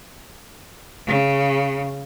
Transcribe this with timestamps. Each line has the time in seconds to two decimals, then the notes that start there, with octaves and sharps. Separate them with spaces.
1.07 C#3